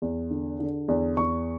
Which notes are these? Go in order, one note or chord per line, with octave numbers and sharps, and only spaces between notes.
E2
D3
D3
E2
E2 C#6